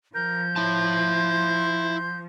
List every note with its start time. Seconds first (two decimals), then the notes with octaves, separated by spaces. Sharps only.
0.15 F3 A#4 G6
0.56 E4 A5 C6